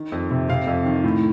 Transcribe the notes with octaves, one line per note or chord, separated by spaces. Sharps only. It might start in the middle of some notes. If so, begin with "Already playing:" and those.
Already playing: D#3
F2
C3
C3 F5
F2
D#3
A2